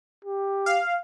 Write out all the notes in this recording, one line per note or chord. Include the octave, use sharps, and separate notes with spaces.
G4
F5